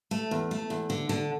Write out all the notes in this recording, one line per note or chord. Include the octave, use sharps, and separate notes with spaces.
A3
E2
A3
E2
D3
D3